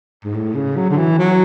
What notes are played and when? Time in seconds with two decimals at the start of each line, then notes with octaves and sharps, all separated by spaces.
0.24 G#2
0.34 A2
0.55 C#3
0.76 F#3
0.90 D3
0.98 E3
1.19 F#3